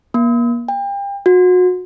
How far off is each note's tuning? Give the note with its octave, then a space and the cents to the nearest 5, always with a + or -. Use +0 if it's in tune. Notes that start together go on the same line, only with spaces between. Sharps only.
A#3 +35
G5 +35
F#4 -30